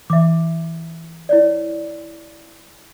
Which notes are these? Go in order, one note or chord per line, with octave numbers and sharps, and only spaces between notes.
E3 E5 D6
E4 C#5 D5